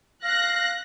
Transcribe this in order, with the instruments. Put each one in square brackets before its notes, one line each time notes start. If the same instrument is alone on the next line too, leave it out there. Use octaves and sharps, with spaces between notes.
[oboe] F5 [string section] F#6 A#6